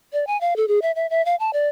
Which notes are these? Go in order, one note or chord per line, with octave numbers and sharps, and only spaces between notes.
D5
G#5
F5
A4
G#4
E5
E5
E5
F5
A5
D5